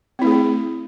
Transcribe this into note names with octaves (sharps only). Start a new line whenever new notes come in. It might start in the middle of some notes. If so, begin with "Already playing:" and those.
A3 C4 E4 G#4